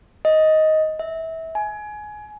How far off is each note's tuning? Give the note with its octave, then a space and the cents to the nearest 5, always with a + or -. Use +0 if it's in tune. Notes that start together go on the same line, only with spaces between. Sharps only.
D#5 +10
E5 -25
G#5 +20